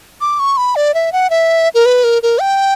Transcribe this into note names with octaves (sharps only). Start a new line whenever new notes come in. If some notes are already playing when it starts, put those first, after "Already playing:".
D6
C#6
B5
D5
E5
F#5
E5
A#4
B4
A#4
A#4
G5